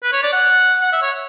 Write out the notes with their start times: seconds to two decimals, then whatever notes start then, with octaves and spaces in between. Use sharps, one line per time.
0.03 B4
0.13 C#5
0.23 D5
0.33 F#5
0.82 F#5
0.92 E5
1.02 C#5